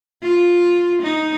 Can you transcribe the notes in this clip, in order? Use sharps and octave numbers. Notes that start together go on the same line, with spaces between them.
F4
D#4